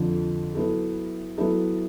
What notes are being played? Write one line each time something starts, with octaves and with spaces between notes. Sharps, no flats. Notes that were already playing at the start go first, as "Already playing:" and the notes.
Already playing: F2 D3 F3
F#3 B3 E4 A4
F#3 B3 E4 A4